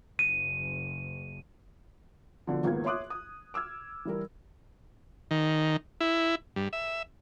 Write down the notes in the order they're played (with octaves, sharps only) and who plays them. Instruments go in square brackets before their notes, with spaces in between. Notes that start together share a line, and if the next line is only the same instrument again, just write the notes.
[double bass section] F#1 [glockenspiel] D#7
[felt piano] A#1 B2 D3 F3
G#1 C#2 A#3 B3 G#6
C#5 E5 C6 D6 D#6 F#6
D#6
D6 E6 F6 G#6
E3 G3 A#4
[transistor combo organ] D#3
E4
G2
E5